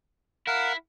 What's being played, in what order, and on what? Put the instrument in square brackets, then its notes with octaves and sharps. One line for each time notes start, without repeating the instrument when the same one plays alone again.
[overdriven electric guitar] E4 [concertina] A#4 F5 F#5